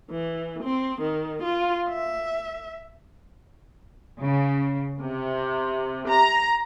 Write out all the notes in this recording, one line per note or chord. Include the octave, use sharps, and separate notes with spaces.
E3
C4
D#3
F4
E5
C#3
C3
A#5